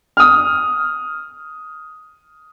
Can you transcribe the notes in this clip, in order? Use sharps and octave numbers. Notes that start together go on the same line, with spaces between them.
D#6 F6